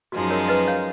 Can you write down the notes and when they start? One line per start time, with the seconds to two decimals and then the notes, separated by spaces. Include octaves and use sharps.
0.12 F#2 F3 G#3 D#4 F#4
0.30 A#4 C#5
0.49 B4 D#5
0.67 C#5 F5